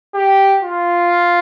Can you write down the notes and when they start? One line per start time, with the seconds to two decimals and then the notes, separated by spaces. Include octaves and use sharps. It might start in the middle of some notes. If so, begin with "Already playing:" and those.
0.14 G4
0.63 F4